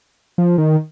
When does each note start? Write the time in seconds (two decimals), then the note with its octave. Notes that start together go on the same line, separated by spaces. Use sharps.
0.38 F3
0.58 D#3